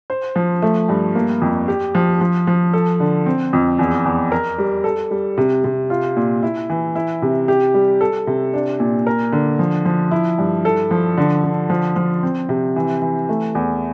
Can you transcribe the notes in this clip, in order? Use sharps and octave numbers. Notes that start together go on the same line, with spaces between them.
C5
F3
A3
G2
A#3
F2
G4
F3
F3
F3
A4
D3
C4
F2
E2
E2
A#4
G3
A4
G3
C3
C3
F4
A#2
E4
E3
E4
C3
G4
G3
A4
C3
D4
A#2
A#4
D3
F3
F3
E4
G2
A4
F3
D3
D3
F3
F3
C4
C3
E3
E3
A3
E2